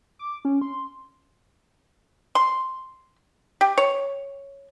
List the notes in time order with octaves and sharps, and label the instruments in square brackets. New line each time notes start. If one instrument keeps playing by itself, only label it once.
[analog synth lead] D6
C#4
C6
[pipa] C6
G4
C#5